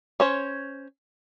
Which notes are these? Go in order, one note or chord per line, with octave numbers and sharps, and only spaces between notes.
C#4 C5 C#5